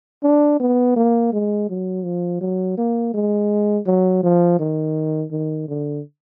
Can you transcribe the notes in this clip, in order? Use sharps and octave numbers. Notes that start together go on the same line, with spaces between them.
D4
B3
A#3
G#3
F#3
F3
F#3
A#3
G#3
F#3
F3
D#3
D#3
D3